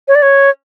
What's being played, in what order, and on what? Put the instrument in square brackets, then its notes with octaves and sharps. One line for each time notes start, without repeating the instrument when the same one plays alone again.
[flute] C#5
D5
C#5